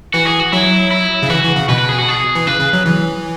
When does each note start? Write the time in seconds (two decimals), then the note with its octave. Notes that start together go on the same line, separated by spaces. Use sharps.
0.14 E3 F#4
0.27 G#4
0.40 F#4
0.52 F#3 E4
0.91 E4
1.23 C#3
1.30 E3 F#4
1.43 E3
1.56 C#3
1.68 B2 B4
1.79 B4
1.89 G#4
1.98 F#4
2.08 G#4
2.35 E3
2.47 C#3 B4
2.60 C#3
2.73 F#3
2.86 E3